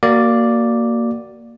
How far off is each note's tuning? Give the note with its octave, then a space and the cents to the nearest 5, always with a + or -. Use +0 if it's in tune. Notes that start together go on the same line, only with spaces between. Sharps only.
A#3 -5 F#4 +20 D5 +0